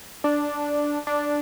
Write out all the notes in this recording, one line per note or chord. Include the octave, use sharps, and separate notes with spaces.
D4
D4